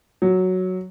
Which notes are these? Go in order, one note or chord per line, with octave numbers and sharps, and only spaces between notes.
F#3